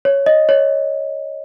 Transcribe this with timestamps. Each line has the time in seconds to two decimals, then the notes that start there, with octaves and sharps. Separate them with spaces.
0.05 C#5
0.26 D#5
0.49 C#5